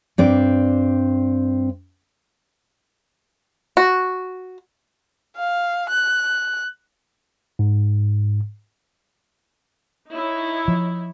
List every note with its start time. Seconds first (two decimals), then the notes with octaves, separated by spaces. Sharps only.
0.18 G2 C4 D5
3.77 F#4
5.37 F5
5.90 F#6
7.59 G#2
10.09 D#4 E4 C#5
10.68 F3